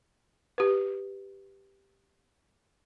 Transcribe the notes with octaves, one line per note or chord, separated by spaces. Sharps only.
G4 B4